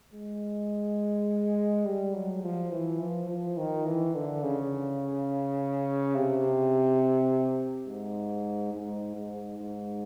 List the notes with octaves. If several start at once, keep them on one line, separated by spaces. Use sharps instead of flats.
G#3
G3
F#3
F3
E3
F3
F3
D#3
E3
D3
C#3
C3
G#2
G#2
G#2
G#2